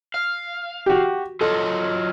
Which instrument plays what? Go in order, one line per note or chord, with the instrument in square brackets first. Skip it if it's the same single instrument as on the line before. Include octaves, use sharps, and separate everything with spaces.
[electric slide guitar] F5
[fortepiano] F#4 G4
[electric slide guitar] F#3 F4 D#5 [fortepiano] A4